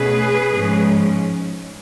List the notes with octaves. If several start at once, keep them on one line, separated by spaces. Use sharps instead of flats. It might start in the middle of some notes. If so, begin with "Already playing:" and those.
Already playing: B2 A3 C#4 G#4 B4
G#2 F3 G#3 C#4